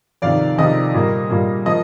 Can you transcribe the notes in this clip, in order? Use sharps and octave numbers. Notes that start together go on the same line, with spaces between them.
F2 C3 D#3 D5 F5
F2 C3 D#3 D#5
A#2 G3 A#3
A#2 G3 A#3
F3 A#3 D#5